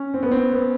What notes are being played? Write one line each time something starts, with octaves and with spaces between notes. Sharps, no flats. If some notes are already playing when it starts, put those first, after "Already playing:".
Already playing: C#4
C4
B3
C4
B3